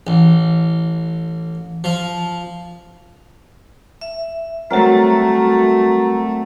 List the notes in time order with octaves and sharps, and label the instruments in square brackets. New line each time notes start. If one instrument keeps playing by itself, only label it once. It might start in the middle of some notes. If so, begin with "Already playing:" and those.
[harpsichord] A1
F3
[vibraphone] E5
[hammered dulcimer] F#3 C4 A#4 [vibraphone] G3 F#4 [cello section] A3